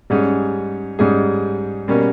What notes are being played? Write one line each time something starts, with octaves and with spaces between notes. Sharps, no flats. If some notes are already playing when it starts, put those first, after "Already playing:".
G#2 G3 C#4 G#4
G#2 G3 C#4 G#4
B2 G3 A#3 C#4